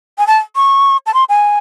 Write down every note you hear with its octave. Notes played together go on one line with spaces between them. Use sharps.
G#5
A5
C#6
A5
C6
G#5